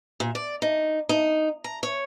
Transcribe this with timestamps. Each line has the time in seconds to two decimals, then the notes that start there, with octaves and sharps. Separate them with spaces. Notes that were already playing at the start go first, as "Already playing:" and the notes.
0.20 A#2
0.35 D5
0.62 D#4
1.09 D#4
1.64 A#5
1.83 C#5